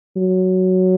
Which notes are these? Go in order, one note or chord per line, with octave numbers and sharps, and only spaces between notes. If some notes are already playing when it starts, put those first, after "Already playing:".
F#3